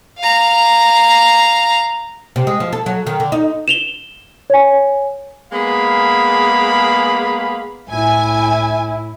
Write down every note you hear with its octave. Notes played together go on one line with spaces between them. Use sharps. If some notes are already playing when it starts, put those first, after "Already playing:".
F5 A#5
C3
G#3
F3
A4
F#3
D#3
D3
D#4
E7 F7 G7
C#5 G#5
G#3 A#3 B3 G#4 F5 B5
A2 E4 G#5